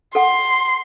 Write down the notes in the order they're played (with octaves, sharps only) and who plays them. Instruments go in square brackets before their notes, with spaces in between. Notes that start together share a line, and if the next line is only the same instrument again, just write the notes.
[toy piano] A4 F#5 G5 [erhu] C6